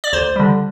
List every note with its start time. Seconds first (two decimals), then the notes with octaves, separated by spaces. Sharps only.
0.04 D5
0.12 D2 C5
0.36 D3 G3